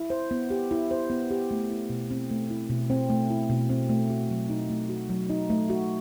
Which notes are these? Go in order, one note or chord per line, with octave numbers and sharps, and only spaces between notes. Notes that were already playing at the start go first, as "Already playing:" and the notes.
Already playing: E4
C5
B3
G4
E4
C5
B3
G4
A3
E4
B2
C4
A3
E4
B2
C4
A3
E4
B2
C4
A3
F#4
F#3
D#4
A3
F#4
F#3
D#4
A3
F#4